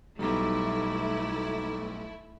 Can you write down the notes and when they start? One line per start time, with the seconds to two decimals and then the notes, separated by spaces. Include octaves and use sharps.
0.19 B1 B2 G3 A3 D#4 E4 A#5 D6